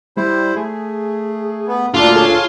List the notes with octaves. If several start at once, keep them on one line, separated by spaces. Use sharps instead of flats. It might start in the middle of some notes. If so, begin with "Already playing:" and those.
G3 E4 C5
A3 G#4
B3
D2 A#2 G3 D4 F4 A4
G#4 A4 C#5 A5